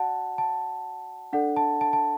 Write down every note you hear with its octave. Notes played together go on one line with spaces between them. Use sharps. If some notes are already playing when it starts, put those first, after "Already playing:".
Already playing: F#4 D5 F#5 A5
A5
D4 A4 D5 F#5
A5
A5
A5